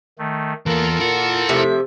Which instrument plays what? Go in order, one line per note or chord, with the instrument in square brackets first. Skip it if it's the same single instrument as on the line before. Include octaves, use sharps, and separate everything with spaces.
[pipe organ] D#3 A3
[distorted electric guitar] E3 B3 [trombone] A#3 [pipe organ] F4 A4 A#4
[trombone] A#2 [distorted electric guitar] E4 F#5
[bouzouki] C3 F3 E5 [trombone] A3